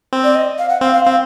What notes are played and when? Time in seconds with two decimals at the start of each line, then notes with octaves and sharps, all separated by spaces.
0.13 C4
0.24 D5
0.35 D#5
0.59 F5
0.69 F#5
0.81 C4 F5
0.93 F5
1.05 C4 F5